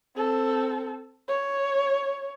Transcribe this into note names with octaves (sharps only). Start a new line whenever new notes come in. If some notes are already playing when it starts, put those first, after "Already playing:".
C4 A4
C#5